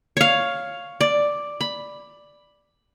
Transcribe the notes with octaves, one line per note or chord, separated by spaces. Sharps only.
C#5 F5
D5
B5